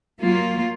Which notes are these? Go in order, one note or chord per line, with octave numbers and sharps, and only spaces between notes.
F#3 A#3 F4